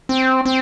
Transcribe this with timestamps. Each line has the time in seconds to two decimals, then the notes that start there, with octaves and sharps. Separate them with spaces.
0.09 C4
0.46 C4